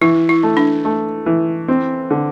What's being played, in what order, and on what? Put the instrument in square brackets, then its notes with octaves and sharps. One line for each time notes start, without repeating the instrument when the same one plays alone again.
[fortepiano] E3 [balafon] E4
[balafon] E4
[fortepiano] A3
[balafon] D4
[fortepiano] A3
E3
C4
D3